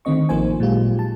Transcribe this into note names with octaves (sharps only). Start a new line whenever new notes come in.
D3 D#3 A3 C4 D#5 C#6
A1 F3 A#3 D#4 C5 G#5
A#2 F#3 G#3 F4 G4
A5